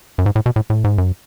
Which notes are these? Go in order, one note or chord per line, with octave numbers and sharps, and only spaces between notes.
F#2
G#2
A2
B2
A2
A2
G#2
F#2